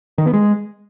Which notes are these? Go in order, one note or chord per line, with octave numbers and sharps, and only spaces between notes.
D#3
B3
G#3